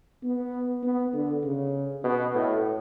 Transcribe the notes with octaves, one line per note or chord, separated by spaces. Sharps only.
B3
B3
D3
C#3
B2
A2